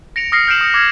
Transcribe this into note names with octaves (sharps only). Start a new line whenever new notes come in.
A#6 C#7 D7 F7
D#6 F6 A#6 C7 C#7
F6 G6 C7 D7 E7 F#7
D#6 C#7
D6 F6 G#6